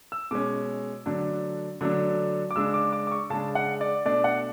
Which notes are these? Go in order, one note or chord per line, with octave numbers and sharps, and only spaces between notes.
E6
B2 G#3 C#4 D6
D3 F#3 A3 D4
D3 F#3 A3 D4
D6
C#3 G#3 D4 E6
D6
D6
D6
C#6
C#3 G#3 D4 A5
F#5
D5
B2 A3 D4 D5
F#5